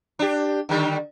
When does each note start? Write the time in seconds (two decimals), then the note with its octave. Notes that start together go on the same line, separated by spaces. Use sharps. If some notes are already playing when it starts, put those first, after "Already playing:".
0.19 D4 G4
0.69 D3 D#3 G3